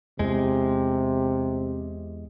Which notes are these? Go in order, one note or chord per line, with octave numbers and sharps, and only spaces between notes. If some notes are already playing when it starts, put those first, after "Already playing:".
E2 C3 G#3